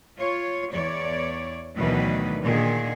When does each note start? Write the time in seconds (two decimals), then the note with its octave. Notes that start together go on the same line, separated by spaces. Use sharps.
0.20 F4 C#5
0.72 E2 C#5 D5
1.78 D2 B2 D#3 E3 F#3 B4
2.43 A#2 D3 D#3 G#4